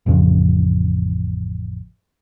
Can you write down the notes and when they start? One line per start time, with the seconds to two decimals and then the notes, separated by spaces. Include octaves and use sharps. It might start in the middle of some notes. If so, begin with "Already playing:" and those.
0.06 A1 F2 C#3